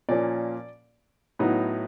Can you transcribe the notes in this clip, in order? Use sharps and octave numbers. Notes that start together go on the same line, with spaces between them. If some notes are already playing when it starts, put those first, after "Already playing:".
A#2 F3 A#3 C#4 D5
A2 F#3 B3 D#4